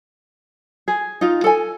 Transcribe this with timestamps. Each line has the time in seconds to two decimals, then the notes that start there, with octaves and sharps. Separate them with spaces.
0.88 G#4
1.21 D#4 F4
1.44 A4 G#5